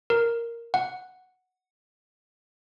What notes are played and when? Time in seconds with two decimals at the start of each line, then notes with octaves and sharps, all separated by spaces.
0.10 A#4
0.74 F#5